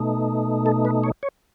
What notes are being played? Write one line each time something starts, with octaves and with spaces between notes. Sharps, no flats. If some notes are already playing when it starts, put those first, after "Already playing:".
Already playing: B2 A3 D#4
A4
B4
C#5
C#5